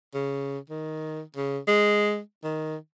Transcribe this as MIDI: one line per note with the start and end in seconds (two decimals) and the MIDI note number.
0.14 0.58 49
0.70 1.21 51
1.36 1.58 49
1.68 2.19 56
2.44 2.76 51